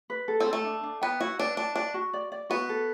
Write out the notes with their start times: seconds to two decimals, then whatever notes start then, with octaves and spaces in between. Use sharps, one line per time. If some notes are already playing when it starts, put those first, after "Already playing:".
0.10 B4
0.28 A4
0.40 C4
0.47 A4
0.53 A3
0.64 D4
0.83 D4
1.02 B3 G5
1.21 E4 F#4
1.40 D4 B4
1.57 D4 A5
1.76 D4 D5
1.94 F#4
2.13 D5
2.32 D5
2.50 B3 F#4
2.69 A4